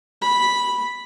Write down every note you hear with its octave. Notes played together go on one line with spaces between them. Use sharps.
B5